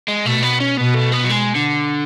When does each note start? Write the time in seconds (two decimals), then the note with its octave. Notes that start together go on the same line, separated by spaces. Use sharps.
0.08 G#3
0.25 B2 A3
0.43 B3
0.61 C#4
0.77 B2 B3
0.95 A3
1.12 B3
1.24 F#3
1.29 G#3
1.55 D3